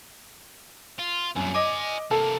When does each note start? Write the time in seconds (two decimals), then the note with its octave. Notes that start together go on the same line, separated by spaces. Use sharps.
0.99 F4
1.36 C2 F#2 A#2
1.55 D5 D#5 G#5 D6
2.11 C3 A#3 A4